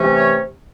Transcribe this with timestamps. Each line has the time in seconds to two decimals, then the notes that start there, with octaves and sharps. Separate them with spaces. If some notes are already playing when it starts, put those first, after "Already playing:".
Already playing: C3 E3 A3 C#4
0.15 C#5